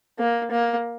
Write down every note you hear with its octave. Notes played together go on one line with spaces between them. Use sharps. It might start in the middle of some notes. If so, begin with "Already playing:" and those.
A#3
A#3